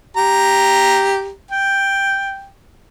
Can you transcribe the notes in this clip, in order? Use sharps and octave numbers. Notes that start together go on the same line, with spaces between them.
G4 A#5
G5